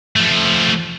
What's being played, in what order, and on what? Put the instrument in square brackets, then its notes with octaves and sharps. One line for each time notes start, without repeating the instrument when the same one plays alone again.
[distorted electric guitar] F3 A3